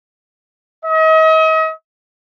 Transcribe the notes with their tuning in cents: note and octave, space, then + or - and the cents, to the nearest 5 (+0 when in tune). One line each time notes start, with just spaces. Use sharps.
D#5 +40